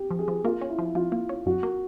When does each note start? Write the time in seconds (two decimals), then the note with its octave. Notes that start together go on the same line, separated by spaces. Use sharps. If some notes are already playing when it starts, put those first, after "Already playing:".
Already playing: G4
0.11 F3
0.19 G#4
0.28 F3
0.45 A#3 F4
0.61 C#4
0.70 E4
0.79 F3
0.95 F3 F4
1.12 A#3
1.29 C#4
1.46 F#2 F#4
1.63 A#3